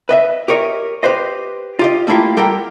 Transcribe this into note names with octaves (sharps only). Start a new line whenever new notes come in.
B4 D#5 E5
G4 A#4 C#5 D#5
G4 B4 C5 D#5
F4 G4 D#5
G3 A3 A#3 E4 F4 G4
G3 G4 A4 A#4 F#5 G5